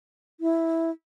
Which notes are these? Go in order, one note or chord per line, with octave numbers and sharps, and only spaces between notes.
E4